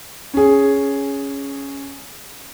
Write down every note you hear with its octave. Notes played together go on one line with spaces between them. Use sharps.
C#4 G#4